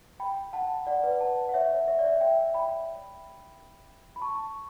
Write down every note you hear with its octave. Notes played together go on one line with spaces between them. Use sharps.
G5 B5
F#5 A5
D5 F#5
B4 D5
F#5 A5
F#5
C#5 E5
C#5 E5
C#5 E5
D5
C#5 E5
E5 G5
G5 B5
B5
A5 C#6